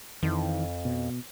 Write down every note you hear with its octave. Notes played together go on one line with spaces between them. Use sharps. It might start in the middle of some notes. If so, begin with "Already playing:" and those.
F2 D#3 E3
B2